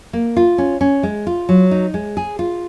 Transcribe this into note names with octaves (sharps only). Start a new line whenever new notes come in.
A#3
F4
C#4
C#4
G#3
F4
F#3
D#4
G#3
G#4
F4